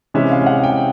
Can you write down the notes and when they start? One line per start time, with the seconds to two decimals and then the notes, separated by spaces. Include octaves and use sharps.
0.14 C3 E3 G#3 C#4 E5
0.31 F5
0.46 F#5
0.63 G5